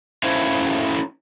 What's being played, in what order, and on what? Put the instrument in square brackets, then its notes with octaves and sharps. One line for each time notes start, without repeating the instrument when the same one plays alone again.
[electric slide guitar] A3 C#4 E4 C5 C#5 F5